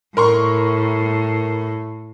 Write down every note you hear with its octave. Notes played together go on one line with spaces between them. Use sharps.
A2 A#4 C6 C#6